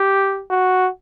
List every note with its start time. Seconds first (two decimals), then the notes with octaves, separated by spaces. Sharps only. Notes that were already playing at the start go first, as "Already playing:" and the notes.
Already playing: G4
0.51 F#4